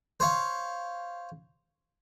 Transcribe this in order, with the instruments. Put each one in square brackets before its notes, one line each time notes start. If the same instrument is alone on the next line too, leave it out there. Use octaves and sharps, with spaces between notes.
[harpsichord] C5 C#5 F5